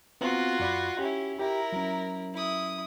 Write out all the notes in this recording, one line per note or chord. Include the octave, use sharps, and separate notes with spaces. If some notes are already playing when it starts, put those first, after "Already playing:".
B3 C4 F4 F#4 A#5
F#2 D5 B5
C#4 E4 G4
E4 G4 A#4
F#3 C#4
E4 D#6